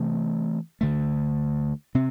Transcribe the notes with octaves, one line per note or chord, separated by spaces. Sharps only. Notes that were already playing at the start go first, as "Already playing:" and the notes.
Already playing: C3 E3 A3 C4
D2 D3 A3
C3 C4